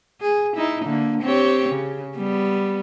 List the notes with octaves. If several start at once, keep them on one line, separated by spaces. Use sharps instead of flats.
G#4
D#4 E4
D3 A#3
C4 G4 C#5
C#3
G3 B3